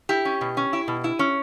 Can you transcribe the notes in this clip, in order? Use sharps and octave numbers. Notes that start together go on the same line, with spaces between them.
E4 G4
C#4
B2
C#4
E4
B2
E4
C#4